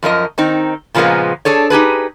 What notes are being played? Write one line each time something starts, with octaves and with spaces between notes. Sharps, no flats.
F#2 F3 A#4 D#5
D#3 C4 D#4
A#2 C#3 F3 G#3 A#3 B3
D4 G#4 A4 C#5
D#4 G4 G#4 B4